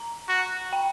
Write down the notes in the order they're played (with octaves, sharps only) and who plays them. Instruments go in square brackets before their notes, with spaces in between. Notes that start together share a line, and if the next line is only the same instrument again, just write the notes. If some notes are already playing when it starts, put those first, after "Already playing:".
Already playing: [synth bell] A#5
[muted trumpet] F#4
[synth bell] G5